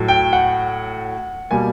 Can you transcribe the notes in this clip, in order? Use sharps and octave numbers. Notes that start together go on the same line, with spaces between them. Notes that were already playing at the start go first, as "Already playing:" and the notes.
Already playing: A2 F#3 A3
G5
F#5
B2 G3 A#3 G#5